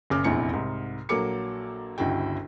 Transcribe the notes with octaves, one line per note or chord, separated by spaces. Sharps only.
F#1 C#3 D6 F6
F1 A#1 E2 C4 E4 C#7
C2 G#2
A#1 F#3 A#3 A4 D6 C#7
G1 C#2 E4 F#4 G5